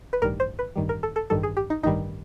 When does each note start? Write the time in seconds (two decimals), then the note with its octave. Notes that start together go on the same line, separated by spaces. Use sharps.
0.13 B4
0.22 A1 G2 D#3 G3 A#4
0.40 C5
0.59 B4
0.76 A1 G2 D#3 G3
0.89 A#4
1.03 A4
1.16 A4
1.30 A1 G2 D#3 G3 A4
1.43 G#4
1.57 G4
1.70 D#4
1.83 A1 G2 D#3 G3 D#4